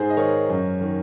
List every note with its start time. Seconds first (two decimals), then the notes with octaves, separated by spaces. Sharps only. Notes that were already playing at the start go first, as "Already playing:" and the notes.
Already playing: G#2 G#4 C5
0.10 D#5
0.17 D#3 A#4 C#5
0.49 F#2
0.81 D#3